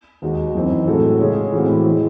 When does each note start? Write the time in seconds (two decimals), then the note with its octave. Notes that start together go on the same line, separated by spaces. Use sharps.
0.22 D#2 D#3 G#3 D#4 F#4
0.55 F#2 E3 C4 D#4
0.87 A2 G#3 C4 F#4 A4
1.20 C#3 G#3 C#4 G#4 C#5
1.52 A2 E3 G#3 C4 F#4
1.87 E3 G#3